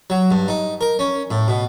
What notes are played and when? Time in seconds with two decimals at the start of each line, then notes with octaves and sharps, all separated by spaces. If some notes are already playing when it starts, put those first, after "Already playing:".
0.10 F#3
0.31 G2
0.48 D#4
0.81 A#4
0.99 C#4
1.31 A2
1.48 B2